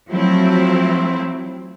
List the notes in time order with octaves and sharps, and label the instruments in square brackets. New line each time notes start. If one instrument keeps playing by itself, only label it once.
[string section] F3 F#3 A3 C4 E4